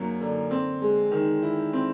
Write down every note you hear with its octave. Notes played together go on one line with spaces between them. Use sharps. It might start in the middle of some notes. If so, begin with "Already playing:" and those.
Already playing: F#2 F#3 A#3
D3
C4
G#3
D#3
E4
C4